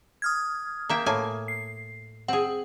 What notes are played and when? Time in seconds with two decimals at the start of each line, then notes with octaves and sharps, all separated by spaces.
0.22 D#6 F6 G#6
0.89 A#3 E5 G5
1.06 A2 A#3 G#5
1.48 C7
2.28 C4 G#4 F#5